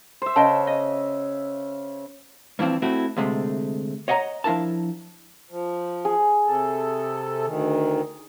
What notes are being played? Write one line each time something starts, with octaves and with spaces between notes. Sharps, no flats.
C5 E5
C#3 D#5 G5 A5
D#5
G2 E3 F3 C4 E4
A3 C4 E4 F#4
D2 C3 G#3 A3
C#5 D#5 F#5 G#5 A#5
F3 D4 E4 A#4 A5
F3
G#4
C3 A4
D2 D#3